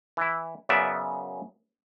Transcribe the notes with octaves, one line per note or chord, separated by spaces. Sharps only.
E3 E4
F#2 C#3 B3 D5 E5